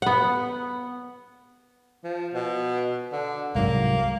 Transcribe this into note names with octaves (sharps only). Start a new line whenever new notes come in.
B3 F#5
F3
B2
D3
C2 G#2 F#3 A#3